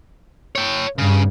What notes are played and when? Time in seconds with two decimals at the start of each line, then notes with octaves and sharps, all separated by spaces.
0.56 C#5 G5
0.98 G2 C#3